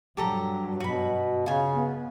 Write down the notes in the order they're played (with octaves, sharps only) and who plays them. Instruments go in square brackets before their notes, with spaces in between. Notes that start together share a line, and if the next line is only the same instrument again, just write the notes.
[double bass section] G2 F#3 [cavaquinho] G4 A4 A#5
[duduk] B2 [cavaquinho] F#4 B5
[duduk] C#3 [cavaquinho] F4 G#5
[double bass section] B3